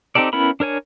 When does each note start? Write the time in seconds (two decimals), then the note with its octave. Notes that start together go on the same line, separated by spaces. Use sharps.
0.15 C4 D#4 G4 A4 D5
0.33 B3 C#4 E4 A#4 B5
0.60 D4 A#4 C#5 G#5